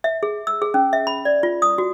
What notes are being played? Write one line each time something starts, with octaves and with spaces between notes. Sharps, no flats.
E5
G#4
E6
G#4
C#4
E5
B5
D5
F4
D#6
F#4